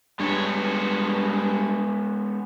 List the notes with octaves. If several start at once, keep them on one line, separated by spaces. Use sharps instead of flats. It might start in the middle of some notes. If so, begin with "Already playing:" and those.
G2 G#3 B3 C#5